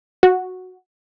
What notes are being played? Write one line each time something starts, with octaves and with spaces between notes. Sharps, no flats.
F#4